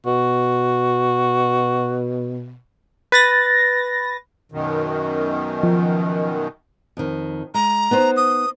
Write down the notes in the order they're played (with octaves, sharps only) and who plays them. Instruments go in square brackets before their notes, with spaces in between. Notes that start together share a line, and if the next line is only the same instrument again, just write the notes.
[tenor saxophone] B2 [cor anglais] F#4
[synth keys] B4 A6 A#6
[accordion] F#2 B2 D#3
[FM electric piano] F3
[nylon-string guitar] F2 D#3
[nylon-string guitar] G#3 [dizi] A#5
[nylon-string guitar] B3 D#4 C5
[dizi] D#6